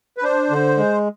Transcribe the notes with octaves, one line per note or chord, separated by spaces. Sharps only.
B4
D4 C5
D3
G#3